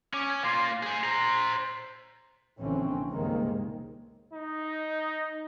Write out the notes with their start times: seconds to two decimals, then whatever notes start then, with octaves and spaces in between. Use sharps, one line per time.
0.14 C#4 D6
0.44 A#3 F4 C6
0.83 G#4 C5
1.04 C5 A#5
2.59 A#1 D3 E3 C4 C#4
3.09 C#2 G2 C3 D#3 G#3 A#3
4.33 D#4